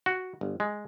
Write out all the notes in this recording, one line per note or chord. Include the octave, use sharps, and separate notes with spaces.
F#4
G1
G#3